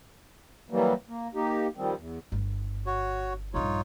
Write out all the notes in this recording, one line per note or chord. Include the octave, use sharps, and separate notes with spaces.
E3 F#3 G3 A#3
A#3
A#3 D#4 G4
D#3 F3 G3 C4
E2
G1
F#4 C#5
A#1 G2 D#4 F4 C#5